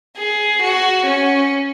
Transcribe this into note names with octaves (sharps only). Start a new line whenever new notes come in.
G#4
F#4
C#4